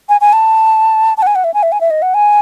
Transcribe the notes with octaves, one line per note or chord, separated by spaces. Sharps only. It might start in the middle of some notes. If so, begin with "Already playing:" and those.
G#5
G#5
A5
A5
F#5
G#5
F#5
E5
G#5
E5
G#5
E5
D#5
F#5
G#5